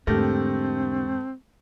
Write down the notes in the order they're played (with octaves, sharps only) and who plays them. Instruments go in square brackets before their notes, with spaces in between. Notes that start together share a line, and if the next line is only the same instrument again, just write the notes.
[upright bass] E2 G#2 [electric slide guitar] D3 G4 A#4 [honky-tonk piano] A3 [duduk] C4